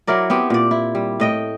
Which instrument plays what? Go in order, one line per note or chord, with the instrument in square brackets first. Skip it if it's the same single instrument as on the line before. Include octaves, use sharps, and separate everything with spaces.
[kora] F#3 E4 A#4 D5
B3 C4 G4
A#2 D5
E4
G3
A2 D#5 G5